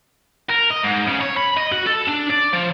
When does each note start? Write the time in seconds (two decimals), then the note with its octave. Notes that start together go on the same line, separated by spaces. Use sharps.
0.49 A#4
0.70 D#5
0.83 G#2
1.07 C#3
1.21 C#5
1.37 B5
1.57 D#5
1.72 F#4
1.86 A4
2.08 D4
2.30 D5
2.53 F3